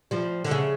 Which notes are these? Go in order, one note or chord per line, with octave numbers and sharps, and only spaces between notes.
F3 G3
D3
C#3